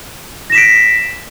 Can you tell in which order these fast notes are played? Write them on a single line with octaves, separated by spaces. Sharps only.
A#6 E7 B6 D7